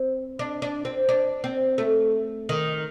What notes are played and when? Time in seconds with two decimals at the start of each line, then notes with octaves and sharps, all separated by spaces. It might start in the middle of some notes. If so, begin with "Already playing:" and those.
Already playing: C4
0.39 D4
0.62 D4
0.85 C4
1.09 D4
1.44 C4
1.78 A3
2.49 D#3